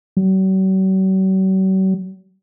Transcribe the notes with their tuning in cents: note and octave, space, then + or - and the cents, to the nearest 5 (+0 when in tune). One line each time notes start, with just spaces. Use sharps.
F#3 +45